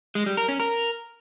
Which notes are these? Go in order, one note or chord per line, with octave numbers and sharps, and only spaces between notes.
G#3
G3
A#4
C#4
A#4